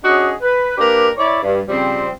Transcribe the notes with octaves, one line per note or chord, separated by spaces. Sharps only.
C#4 D4 F#4 G#4 D#5
B4
A#3 D4 G4 A#4 B4
E4 C#5 D5
G2
C#3 F3 G3 C4